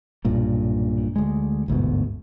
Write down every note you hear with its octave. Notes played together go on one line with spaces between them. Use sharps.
B1 G2 A#2
D2 G#3
G1 D2 G#2 B2